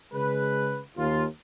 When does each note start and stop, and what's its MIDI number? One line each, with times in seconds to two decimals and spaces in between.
0.13 0.80 49
0.13 0.80 56
0.13 0.80 71
0.97 1.24 39
0.97 1.24 65